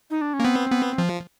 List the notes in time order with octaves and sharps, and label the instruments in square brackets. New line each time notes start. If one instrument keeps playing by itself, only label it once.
[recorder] D#4
D4
C#4
[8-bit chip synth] A#3
[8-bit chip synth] B3 [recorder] C4
[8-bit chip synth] B3
F3